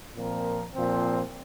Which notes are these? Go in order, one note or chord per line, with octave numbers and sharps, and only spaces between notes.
A#2 F3 C4 A#4
A#2 F3 C4